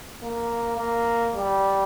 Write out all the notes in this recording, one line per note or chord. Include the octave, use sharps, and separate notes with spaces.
A#3
A#3
G3